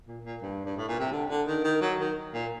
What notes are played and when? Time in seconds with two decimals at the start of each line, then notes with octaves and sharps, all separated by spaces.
0.07 A#2
0.24 A#2
0.42 G2
0.65 G2
0.77 A2
0.88 A#2
1.00 C3
1.11 D3
1.30 D3
1.47 D#3
1.64 D#3
1.81 F#3
1.99 D#3
2.34 A#2